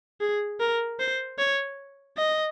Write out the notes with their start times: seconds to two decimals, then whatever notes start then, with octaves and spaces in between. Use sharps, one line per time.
0.21 G#4
0.60 A#4
1.00 C5
1.39 C#5
2.17 D#5